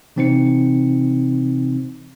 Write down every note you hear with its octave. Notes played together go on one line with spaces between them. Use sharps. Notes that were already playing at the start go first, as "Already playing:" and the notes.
C3 E3 C4 D#4 C5 C#7